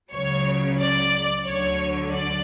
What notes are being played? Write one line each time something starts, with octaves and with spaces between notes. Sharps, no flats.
C#2 C#3 F#3 C#5
D5
D2 D3 F#3 C#5
D5